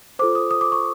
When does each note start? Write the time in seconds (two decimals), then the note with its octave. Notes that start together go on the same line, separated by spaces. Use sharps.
0.19 F4 A4 C5 D6
0.35 D#6
0.51 D#6
0.61 D6
0.72 C#6